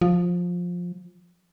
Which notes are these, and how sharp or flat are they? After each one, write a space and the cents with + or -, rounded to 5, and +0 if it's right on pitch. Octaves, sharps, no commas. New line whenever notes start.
F3 +15